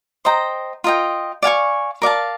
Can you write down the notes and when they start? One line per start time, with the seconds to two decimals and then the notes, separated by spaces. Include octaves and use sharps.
0.25 C5 D#5 G5 A#5
0.84 F4 A#4 D#5 G5
1.42 D5 F5 G#5 C#6
2.02 A#4 D5 F5 A5